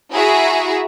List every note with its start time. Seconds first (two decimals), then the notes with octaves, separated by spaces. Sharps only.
0.13 E4 F#4 G#4 E5 A#5